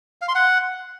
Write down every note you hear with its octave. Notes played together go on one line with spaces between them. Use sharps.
F5
C6
F#5